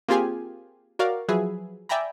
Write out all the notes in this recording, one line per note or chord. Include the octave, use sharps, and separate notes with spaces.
A#3 C4 F4 G4 G#4 G#5
F#4 A#4 C#5 D5 F5
F3 F#3 G#4 B4 E5
D5 E5 G5 G#5 A#5 B5